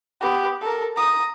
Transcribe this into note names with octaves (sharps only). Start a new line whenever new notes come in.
B3 G4
A4 A#4
A#5 D#6